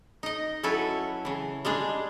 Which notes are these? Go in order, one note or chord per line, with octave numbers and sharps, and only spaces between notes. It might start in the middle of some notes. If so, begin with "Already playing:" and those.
D#4 D#5
F#3 C#4 E4 A4 B4
C#3 E3
G3 G#3 D4 G#4